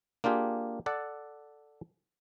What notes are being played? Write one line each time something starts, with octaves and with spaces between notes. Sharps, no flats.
A#3 D4 F4 G4 G#4
A4 D5 F#5 A5